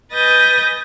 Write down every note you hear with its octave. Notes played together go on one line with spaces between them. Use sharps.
B4 D#5 G#5 G6 A6 A#6